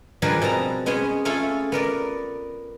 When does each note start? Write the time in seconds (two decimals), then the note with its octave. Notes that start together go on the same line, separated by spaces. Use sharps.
0.22 F3 G3 D4 G#4 A#4 B4
0.42 B2 C4 A5 A#5
0.86 G#3 B3 C#4 G#4
1.25 A3 C#4 F4 G#4 A4
1.72 B3 A#4 D5